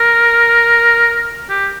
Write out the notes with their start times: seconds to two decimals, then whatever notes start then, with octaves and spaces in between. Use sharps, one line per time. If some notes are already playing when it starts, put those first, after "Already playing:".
Already playing: A#4
1.49 G4